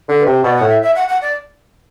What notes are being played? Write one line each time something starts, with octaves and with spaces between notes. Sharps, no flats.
D3
B4
C3
C5
B2 D5
F#5
A2
E5
E5
F#5
F#5
D5